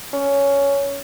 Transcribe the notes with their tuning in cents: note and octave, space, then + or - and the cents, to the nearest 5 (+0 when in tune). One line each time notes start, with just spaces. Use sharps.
C#4 +10